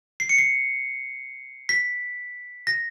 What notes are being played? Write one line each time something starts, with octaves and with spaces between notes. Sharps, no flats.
C7
C#7
C7
B6
A#6